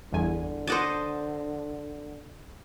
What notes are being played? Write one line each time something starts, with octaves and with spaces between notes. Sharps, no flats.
G1 E2 D3 G#5
C5 D#5 F#5 A5 D6 D#7